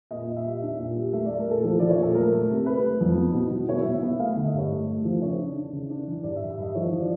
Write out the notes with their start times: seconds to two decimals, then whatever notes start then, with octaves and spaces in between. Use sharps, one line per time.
0.11 A#2 D#5
0.27 A#2
0.37 E5
0.45 G3
0.62 D4 E5
0.79 A#2
0.96 G3
1.13 A3 E5
1.26 A3 D5
1.38 A#4
1.47 A#2 A4
1.64 F3 A4
1.79 F3 D5
1.90 C#5
1.98 A#2 A4
2.15 A3 A#4
2.32 A3
2.49 C3
2.66 C3 B4
2.83 A3
3.01 F2
3.17 B3
3.34 B2
3.51 B2
3.69 B2 C#5
3.81 E5
3.85 B2
3.94 E5
4.03 B3
4.19 A3 F5
4.33 D3 E5
4.45 D#5
4.54 G2 C#5
4.71 A3
4.88 A3
5.05 F3
5.22 C#3 C#5
5.38 D4
5.56 D4
5.73 C#3
5.90 D4
6.07 E3
6.24 G2 D5
6.36 E5
6.40 G2
6.50 E5
6.58 G2 D#5
6.75 F3 C#5
6.93 F3
7.01 D5